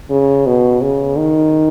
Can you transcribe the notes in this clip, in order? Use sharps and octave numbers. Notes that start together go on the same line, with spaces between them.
C#3
B2
C#3
D#3